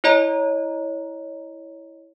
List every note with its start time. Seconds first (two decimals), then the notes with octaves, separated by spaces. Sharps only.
0.04 E4 C#5 D#5 A#5